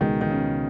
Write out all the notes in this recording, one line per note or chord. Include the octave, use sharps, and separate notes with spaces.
C#2 B2 D#3 G#3
D#3
C#3